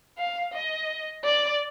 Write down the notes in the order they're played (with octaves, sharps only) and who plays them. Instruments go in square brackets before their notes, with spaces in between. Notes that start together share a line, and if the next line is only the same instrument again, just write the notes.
[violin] F5
D#5
D5